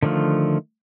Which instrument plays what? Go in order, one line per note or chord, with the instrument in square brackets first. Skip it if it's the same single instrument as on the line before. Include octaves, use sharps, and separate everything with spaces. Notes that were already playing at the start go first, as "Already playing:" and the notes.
[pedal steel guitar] D3 D#3 F3 A3 F4